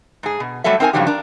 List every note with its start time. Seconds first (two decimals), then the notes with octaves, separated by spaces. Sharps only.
0.23 G#2 G#4
0.40 B2
0.64 F#3 G3 A3 A4 E5
0.80 C4 D#4 A#4 F5 G#5
0.93 G2 C#3 F3 F#3 D#4 G4
1.07 D4 A#4